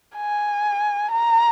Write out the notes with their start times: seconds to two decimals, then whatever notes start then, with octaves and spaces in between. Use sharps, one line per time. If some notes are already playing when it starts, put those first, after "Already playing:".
0.17 G#5
1.12 A#5